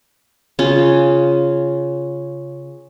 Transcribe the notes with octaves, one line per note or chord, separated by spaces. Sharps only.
C#3 C#4 F4